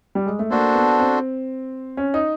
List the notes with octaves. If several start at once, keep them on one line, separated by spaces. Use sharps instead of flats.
G3
G#3
A3
A#3 D4 F#4 A4 C5
B3
C4
C#4
D#4